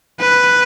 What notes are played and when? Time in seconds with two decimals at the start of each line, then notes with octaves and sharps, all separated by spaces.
0.20 B4